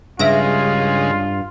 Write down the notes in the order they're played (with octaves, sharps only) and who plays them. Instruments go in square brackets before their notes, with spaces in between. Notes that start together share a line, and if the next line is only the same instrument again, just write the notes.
[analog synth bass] G2 [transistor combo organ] C#3 G#3 [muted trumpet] F4 [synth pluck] E5 A#6 D7